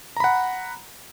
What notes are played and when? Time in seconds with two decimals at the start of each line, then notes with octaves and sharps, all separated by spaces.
0.17 A#5
0.20 B5
0.24 F#5